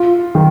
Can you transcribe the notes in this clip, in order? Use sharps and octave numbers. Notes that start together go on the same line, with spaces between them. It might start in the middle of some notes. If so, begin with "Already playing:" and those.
Already playing: F4
D#3